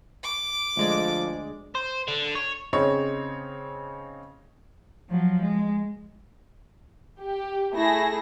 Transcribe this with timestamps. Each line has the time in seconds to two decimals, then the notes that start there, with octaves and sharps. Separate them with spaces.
0.23 D6
0.77 D2 F3 G#3 D5
1.75 C5
2.08 D3
2.35 C#5
2.73 C#3 C4 D#4 C#5
5.10 F3 F#3
5.42 G#3
7.21 G4
7.74 A3 E4 G#4 A#6